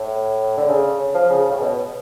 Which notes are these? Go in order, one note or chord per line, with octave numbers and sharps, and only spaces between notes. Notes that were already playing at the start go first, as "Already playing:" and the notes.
Already playing: A2
D3
C#3
F3
C#3
A2
B2